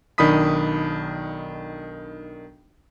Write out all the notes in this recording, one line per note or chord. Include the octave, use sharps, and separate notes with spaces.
B1 D#3 D4 B5 D#6 B6